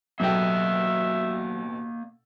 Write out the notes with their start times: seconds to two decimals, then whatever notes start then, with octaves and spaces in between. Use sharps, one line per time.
0.20 A1 B2 F#3 A#3 A4 D#5 E5 G5